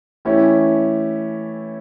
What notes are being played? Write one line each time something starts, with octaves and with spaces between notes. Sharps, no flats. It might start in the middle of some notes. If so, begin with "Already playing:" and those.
E3 A3 C#4 E4 G4